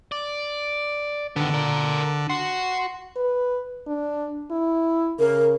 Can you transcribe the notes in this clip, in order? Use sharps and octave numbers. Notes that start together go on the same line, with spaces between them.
D5
D3 D#3 B3
A#4 D5
F#4 C6
B4
D4
E4
C#3 A#4